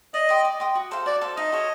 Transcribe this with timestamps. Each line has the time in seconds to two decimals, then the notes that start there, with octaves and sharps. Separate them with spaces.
0.14 D5 D#5
0.29 G5 C6 D#6
0.45 D5
0.60 G5 C6 D#6
0.75 F#4
0.91 A4 C5 F5
1.06 F#4 D5
1.21 A4 C5 F5
1.36 D#4 D#5
1.52 F#4 A4 C#5